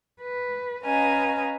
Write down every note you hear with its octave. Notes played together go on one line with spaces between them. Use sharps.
B4
C#4 B4 D#5 F5 G#5 A#5